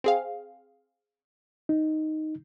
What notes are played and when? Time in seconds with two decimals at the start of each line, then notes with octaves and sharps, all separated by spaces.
0.04 C4 G#4 F5
1.69 D#4